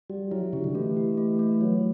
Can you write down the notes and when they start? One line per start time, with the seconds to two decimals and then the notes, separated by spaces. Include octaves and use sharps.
0.10 G3 F#4
0.31 F#3 E4
0.53 C#3 G4
0.64 D3
0.75 E3 A3
0.97 G4
1.17 A3
1.39 A3
1.61 F#3 A3